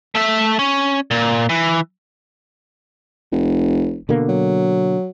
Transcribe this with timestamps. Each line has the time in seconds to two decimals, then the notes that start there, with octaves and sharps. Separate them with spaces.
0.15 A3 E5
0.59 C#4
1.11 A#2
1.49 E3
3.32 F1
4.09 B2 D3 A#3
4.29 F#3